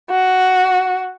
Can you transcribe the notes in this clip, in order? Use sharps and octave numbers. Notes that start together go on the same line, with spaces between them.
F#4